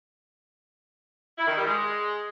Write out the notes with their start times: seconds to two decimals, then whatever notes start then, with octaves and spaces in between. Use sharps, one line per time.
1.38 E4
1.47 D#3
1.56 G3
1.65 G#3